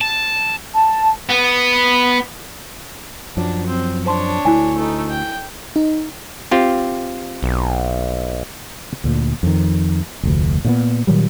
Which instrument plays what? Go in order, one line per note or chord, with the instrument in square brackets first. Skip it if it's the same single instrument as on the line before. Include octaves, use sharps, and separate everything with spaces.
[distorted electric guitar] A5
[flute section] A5
[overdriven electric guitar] B3
[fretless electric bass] F#2 F3 F#3 [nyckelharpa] D4
[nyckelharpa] C4
[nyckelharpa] D4 C#5 [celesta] C5 A5 C6
[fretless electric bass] D2 [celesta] E4 G#5
[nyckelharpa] A3 D#4
G5
[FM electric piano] D#4
[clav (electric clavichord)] C4 F4 G4
[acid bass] B1
[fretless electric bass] D2 A#2
F2 D#3
F1 D2
A#2 C#3 B3
A#2 D#3 F#3 G3